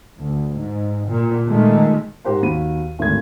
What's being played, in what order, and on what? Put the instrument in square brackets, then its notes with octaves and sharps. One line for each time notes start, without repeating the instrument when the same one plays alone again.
[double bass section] D2
G#2
A#2
A#2 D#3 G#3 A3
[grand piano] G#2 G4 A#4 C5 F#5 C6
D#2 F#4 B5 D#7
G#1 D2 G#6